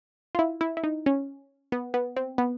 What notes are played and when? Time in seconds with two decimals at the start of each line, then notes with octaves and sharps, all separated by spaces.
0.35 F4
0.39 E4
0.61 E4
0.77 E4
0.84 D#4
1.06 C#4
1.72 B3
1.94 B3
2.16 C4
2.38 B3